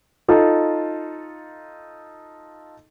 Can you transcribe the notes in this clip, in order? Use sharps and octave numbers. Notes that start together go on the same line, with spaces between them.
D#4 F4 A4